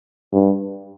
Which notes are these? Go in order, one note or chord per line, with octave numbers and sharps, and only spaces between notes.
G2